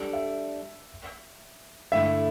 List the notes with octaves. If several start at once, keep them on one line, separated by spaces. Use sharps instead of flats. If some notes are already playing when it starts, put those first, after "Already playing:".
Already playing: G3 D4 A4 D5
E5
G2 D3 A3 E4 E5